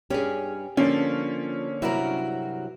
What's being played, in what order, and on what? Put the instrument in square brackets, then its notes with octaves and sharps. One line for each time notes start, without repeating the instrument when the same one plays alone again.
[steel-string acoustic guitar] G2 C#4 [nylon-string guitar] G4 G#4
[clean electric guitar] D3 A#3 D4 [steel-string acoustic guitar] F3 [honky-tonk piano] C#4
[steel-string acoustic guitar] G2 F#4 A#4 [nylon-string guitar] C3 F#3 E4